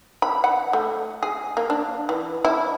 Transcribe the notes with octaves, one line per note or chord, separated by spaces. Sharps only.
B5
F#5
A3
G#4
A#3
D4
E3
E4